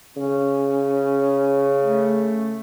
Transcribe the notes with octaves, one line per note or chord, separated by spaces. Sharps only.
C#3 C#4
A3